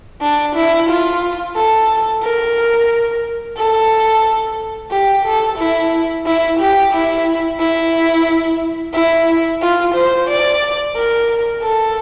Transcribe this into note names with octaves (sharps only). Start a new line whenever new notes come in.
D4
E4
F4
A4
A#4
A4
G4
A4
E4
E4
G4
E4
E4
E4
F4
C5
D5
A#4
A4